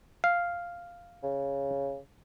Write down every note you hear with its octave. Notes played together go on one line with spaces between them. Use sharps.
F5
C#3